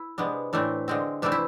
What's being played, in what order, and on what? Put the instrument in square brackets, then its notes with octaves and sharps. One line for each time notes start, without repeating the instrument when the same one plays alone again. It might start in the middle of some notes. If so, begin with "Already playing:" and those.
Already playing: [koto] E4
C3 G#3 B3 D4
A2 E3 A3 C4 D4
D3 G#3 C4
C3 E3 A3 C4 D4
E4